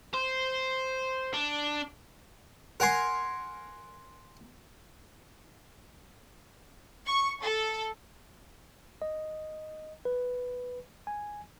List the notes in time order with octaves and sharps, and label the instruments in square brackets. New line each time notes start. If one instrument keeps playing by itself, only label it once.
[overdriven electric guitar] C5
D4
[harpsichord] A#4 F#5 G#5 C6
[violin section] C#6
A4
[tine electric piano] D#5
B4
G#5